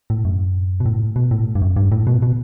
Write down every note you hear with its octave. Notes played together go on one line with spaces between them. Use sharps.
A2
F#2
B2
A2
B2
A2
G2
F#2
G2
A2
B2
B2